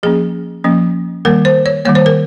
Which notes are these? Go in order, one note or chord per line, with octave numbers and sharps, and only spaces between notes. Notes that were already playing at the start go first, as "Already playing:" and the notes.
F3 A#3 C#4 G#4
F3 A#3 C#4
D#3 G3 A#3 A#4
C5
C#5
D#3 G3 A#3 C#5
C5
A#4